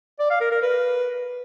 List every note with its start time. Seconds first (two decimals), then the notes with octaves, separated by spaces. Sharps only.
0.19 D5
0.30 F5
0.41 A#4
0.51 A#4
0.62 B4